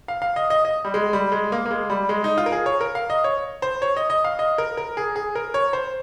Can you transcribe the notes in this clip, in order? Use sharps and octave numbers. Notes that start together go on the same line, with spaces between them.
F5
F5
D#5
D#5
D#5
G3
G#3
G3
G#3
A#3
A#3
G#3
G3
G#3
D#4
F4
A#4
G#4
C#5
A#4
F5
D#5
C#5
C5
C#5
D#5
D#5
F5
D#5
A#4
A#4
G#4
G#4
A#4
C#5
C5